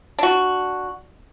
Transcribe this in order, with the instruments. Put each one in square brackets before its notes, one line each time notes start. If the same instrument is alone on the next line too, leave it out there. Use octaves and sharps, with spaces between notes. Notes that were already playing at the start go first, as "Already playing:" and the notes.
[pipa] D4 F#4